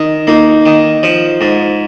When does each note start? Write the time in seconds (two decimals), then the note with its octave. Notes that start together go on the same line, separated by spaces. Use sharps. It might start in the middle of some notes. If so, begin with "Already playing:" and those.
Already playing: D#3
0.27 A#3 D#4
0.66 D#3
1.03 F3
1.41 G#2